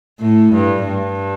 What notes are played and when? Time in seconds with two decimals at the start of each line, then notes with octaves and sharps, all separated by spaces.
0.20 A2
0.53 G2
0.86 G2